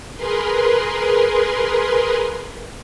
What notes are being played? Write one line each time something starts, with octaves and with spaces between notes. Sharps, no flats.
G#4 A#4 B4 C6